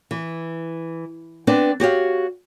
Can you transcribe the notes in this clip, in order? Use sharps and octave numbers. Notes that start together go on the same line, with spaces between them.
E3
B3 C4 D4 B4
F#4 G4 C#5 F5